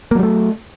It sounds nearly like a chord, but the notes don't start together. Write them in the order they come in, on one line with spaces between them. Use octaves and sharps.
A#3 F#3 G3 A3